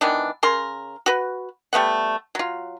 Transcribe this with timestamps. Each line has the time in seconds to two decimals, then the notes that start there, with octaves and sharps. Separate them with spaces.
0.01 D#3 E3 B3 D4
0.43 C#3 A#4 C6
1.06 F#4 B4
1.73 G3 A3 B3 F#5
2.35 F#3 F4